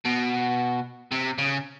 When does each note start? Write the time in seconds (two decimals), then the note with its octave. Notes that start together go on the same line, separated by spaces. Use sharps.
0.05 B2
1.11 C3
1.38 C#3